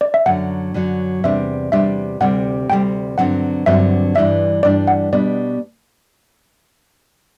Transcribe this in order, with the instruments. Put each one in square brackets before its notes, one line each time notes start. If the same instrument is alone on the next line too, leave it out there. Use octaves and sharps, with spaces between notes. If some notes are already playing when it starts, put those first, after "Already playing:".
[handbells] D5
E5
[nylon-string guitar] F#2 D3 F#3 [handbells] F#5
[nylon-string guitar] F#2 D3 F#3
[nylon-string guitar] E2 C3 G3 D4 [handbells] E5
[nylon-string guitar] E2 C3 G3 D4 [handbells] E5
[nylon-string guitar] D2 C3 G3 [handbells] F#5
[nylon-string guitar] D2 C3 G3 [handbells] G5
[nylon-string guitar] G2 D3 F#3 C4 [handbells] F#5
[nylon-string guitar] G2 D3 F#3 C4 [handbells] E5
[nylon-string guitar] G2 E3 G3 D4 [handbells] E5
[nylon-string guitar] G2 E3 G3 D4 [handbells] D5
[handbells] F#5
[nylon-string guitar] B2 G3 B3 D4 [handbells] D5